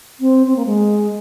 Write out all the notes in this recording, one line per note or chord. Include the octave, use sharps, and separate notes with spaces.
C4
C4
A#3
G#3